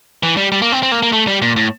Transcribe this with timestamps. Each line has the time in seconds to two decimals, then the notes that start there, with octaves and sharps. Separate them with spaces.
0.23 E3
0.37 G3
0.52 G3
0.62 A#3
0.72 C4
0.83 C4
0.92 A#3
1.03 A#3
1.12 A3
1.27 G3
1.42 A#2
1.56 A2